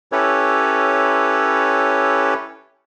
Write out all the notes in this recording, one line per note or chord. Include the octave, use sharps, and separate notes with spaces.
C#4 E4 G4 A4 B4 C#5